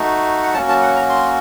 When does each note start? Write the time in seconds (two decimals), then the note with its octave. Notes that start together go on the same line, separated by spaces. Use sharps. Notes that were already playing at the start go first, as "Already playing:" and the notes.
Already playing: A3 D#4 F#4
0.43 F#5
0.54 F#3 A#3 C#4 F#4 A5
0.68 A5
0.83 F#5
0.96 A#5
1.09 C6